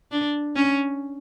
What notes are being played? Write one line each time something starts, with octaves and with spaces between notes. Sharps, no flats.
D4
C#4